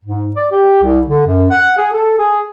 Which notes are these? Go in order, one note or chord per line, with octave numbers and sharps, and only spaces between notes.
G#2
D5
G4
C2
D3
F#2
F#5
G#4
A4
G#4